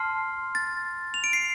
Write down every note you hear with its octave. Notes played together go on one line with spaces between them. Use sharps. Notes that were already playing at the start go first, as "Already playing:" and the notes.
Already playing: A5 C6 F6 C7
A6
F7
D7
C7